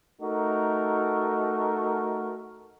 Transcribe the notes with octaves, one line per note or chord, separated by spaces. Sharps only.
A3 D#4 F#4 A#4